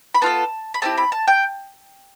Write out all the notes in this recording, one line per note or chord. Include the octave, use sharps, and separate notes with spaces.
B5
B3 F4 A4 A5
B5
A3 C4 E4 G4 A5
B5
A5
G5